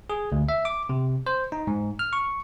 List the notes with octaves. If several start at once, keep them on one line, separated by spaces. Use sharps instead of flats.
G#4
D2
E5
D6
C3
C5
D#4
G#2
F6
C#6